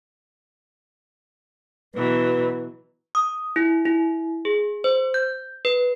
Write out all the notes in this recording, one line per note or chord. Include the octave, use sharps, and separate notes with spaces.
B2 E3 F#3 B4
D#6
E4
E4
G#4
C5
G6
B4